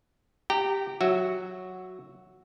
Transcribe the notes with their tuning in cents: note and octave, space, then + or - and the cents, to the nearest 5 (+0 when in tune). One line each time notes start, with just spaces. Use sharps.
G4 +0 G5 -25 A#5 -25
F#3 -5 F#4 +0 E5 +0